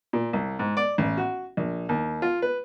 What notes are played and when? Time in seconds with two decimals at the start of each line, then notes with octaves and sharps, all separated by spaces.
0.13 A#2
0.33 C2
0.59 G#2
0.77 D5
0.98 A1
1.17 F#4
1.57 A#1
1.89 D#2
2.22 F4
2.42 B4